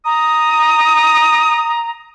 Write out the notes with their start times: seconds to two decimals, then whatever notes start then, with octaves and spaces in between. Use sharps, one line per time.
0.05 A#5 D#6